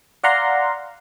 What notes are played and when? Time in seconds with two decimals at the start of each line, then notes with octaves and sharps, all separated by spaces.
0.24 D5 F5 F#5 A#5 C6